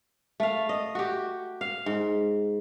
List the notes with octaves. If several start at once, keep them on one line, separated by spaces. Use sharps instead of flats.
A3 F5
D#5
F#4 G4
F5
G#2